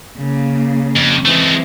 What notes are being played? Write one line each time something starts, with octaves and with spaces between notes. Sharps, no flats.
C#3 A#3
F2
E3 G#3 A3 C4